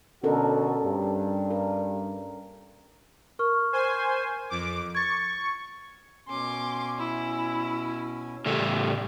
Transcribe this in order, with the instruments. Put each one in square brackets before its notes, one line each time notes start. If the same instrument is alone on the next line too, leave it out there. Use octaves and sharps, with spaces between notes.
[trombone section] B2 D3 F#4 [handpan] C#4 A4 A#4
[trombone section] G2
[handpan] A#4
[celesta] A#4 C#6 F6
[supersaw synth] C5 G#5
F2 D6
[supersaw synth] C#6 [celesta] G#6 A6
[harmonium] B2 C#4 G#5 [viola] C6 D6
[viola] E4
[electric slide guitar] A2 C#3 A4 [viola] G3 [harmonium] G4 D5